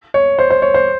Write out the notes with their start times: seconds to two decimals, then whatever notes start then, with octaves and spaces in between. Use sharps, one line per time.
0.14 C#5
0.39 C5
0.50 C5
0.62 C#5
0.74 C5